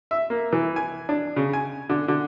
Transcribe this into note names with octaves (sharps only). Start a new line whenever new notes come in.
E5
A#3
E3
G#5
D4
C#3
G#5
D3
D3